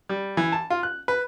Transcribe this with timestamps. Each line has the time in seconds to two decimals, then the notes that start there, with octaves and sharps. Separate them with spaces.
0.09 G3
0.37 E3
0.52 A5
0.70 F4
0.83 F#6
1.08 B4